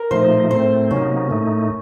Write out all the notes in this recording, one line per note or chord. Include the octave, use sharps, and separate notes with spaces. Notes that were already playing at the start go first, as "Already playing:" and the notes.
Already playing: A#4
A#2 F3 A3 D#4 C5
A2 A3 C4 C5
C3 F#3 A#3 C#4 D#4
A2 A3 D#4